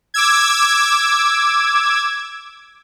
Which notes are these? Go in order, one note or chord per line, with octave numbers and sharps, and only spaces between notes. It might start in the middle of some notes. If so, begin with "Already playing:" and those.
D6 E6 G#6